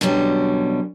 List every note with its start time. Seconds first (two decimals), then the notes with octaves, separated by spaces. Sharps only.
0.01 B2 D3 F#3 G3 C#4